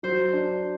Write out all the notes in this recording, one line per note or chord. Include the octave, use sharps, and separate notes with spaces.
F#3 C5
D4